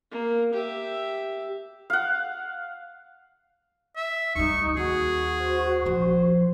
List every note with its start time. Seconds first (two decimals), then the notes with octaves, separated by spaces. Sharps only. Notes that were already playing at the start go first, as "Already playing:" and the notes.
0.12 A#3
0.54 G4 E5
1.90 F5 F#5
3.96 E5
4.36 D2 G3 D#4 C#6
4.77 D#2 F#4 G#4
5.41 C5
5.86 A#1 F3 C5